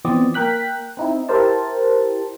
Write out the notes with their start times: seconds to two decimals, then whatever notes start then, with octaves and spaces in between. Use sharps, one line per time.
0.05 E3 F3 B3 C4 D5 D#5
0.34 A#3 A#4 G5 F#6 B6
0.97 C4 D#4 E4
1.29 E4 G4 A#4 C5 A5